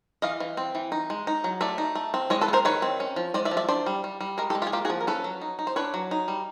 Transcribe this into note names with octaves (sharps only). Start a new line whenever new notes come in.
E3 D#5 F5
E3
C4
E3
D#4
G#3
D#4
F#3
A3 D5 E5
D#4
A3
C4
G#3 C#5 D#5
A4 B4
B3
A#4 C5
D#3 B4 C#5
C4
C#4
F3
G#3 C5 D5
D5 E5
F3
D5 E5
D4 C5 D5
G3
G3
G3
G#3 G#4 A#4
G4 A4
G#3
F4 G4
G#4
A#3 F4 G4
F#4 G#4
F3
A#4
C#4 A4 B4
F#3
D#4
D#4
C5
D4 B4 C#5
F#3
D#4
G3